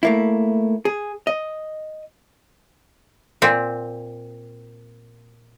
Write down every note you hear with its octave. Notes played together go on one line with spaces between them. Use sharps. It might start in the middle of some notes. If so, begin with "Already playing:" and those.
A3 A#3 E4
G#4
D#5
A#2 C4